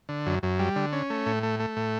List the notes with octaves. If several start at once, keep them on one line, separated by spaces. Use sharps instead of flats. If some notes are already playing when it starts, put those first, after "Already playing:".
D3
F#2
F#2
G3
D3
C#4
A3
A2
A3
A3
A2